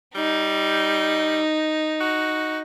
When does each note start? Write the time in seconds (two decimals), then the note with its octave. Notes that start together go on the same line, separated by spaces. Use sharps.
0.15 G3 D#4
2.00 F#4